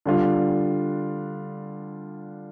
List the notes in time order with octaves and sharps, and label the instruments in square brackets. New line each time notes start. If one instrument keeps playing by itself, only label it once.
[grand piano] D3 G3 D4 F4